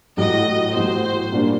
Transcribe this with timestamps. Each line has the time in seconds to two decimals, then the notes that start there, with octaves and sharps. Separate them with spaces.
0.17 A1 A2 F#3 D#5
0.75 A1 A2 F#3 C5
1.32 A#2 G3 A#3 D4